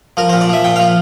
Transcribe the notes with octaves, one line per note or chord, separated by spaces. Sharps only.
F3 A#4
C5
A#2
D5
F3 E5
A#2 G5
F5
F3